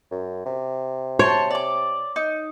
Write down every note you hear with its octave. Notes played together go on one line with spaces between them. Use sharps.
F#2
C3
C5 C#5 A5
D5 D6
D#4